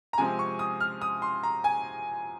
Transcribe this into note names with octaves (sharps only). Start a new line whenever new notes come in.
A#5
C3 F3 G#3 C4 G#5
C#6
D#6
F6
D#6
C6
A#5
G#5